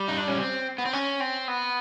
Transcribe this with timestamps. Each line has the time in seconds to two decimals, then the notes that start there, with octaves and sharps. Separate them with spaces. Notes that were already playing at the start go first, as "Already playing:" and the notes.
Already playing: G3
0.08 D#4
0.18 D4
0.28 C#4
0.38 C4
0.78 B3
0.85 C4
0.93 C#4
1.20 C4
1.48 B3